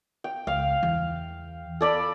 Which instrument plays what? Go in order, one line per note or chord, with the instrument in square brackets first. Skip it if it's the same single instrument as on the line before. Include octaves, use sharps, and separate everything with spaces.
[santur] G5
[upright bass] C#2 [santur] F5
[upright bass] E2
[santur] A4 D5 B5